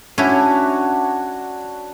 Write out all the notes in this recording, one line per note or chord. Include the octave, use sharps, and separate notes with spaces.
C#4 D4 E4 F#4 C#5